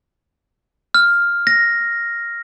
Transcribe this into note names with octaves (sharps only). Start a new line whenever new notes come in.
F6
A#6